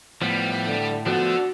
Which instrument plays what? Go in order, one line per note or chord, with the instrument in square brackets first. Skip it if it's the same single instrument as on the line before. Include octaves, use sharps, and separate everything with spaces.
[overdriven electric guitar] A2 [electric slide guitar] F3 B3 [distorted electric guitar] G3
[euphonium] D3
[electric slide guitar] F3 A3 B3 [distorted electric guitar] D4 A4 [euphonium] F#4